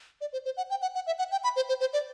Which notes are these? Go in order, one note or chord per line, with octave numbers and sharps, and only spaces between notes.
D5
C5
C5
F#5
G5
F#5
F#5
E5
F#5
G5
B5
C5
C5
C5
D5